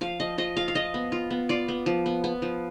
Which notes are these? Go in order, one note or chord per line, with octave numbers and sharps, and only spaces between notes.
F3 F5
F3 D#5
F3 D#5
F4 F5
F5
F3 D#5
B3
F4
B3
F4 D5
B3
F3
B3
B3
F3